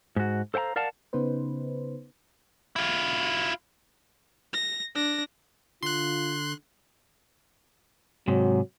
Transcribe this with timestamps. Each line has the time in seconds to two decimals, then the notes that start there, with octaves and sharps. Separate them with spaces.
0.16 G#2 F#4
0.54 A4 C5 F5 G5 A#5
0.76 A#4 D5 F5 F#5 A5
1.13 C#3 B3 D#4 B4 C5
2.76 E4 F4
4.53 A#6
4.95 D4 A#6
5.83 D3 F4 C6 F#6
8.28 G#2 C3 F#3